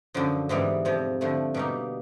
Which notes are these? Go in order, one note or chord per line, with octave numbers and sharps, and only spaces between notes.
F#2 D3 F3
G#2 E3 G3 B3
F2 C3 F3
D3 F3 A3
B2 G3 A#3 D#4